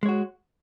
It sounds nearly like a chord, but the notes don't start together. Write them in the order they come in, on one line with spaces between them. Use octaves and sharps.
G#3 C#5 F#4